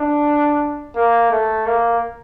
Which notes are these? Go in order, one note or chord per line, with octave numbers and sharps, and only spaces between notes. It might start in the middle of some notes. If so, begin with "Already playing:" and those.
Already playing: D4
A#3
A3
A#3